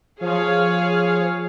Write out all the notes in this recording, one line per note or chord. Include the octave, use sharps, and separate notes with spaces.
F3 G#4 C#5 F5